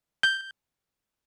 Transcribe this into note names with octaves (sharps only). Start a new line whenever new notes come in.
G6